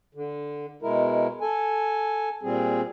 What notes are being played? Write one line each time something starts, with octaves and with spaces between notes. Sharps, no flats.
D3
B2 G#3 E4 A#4
A4 G#5
A#2 G3 C4 G#4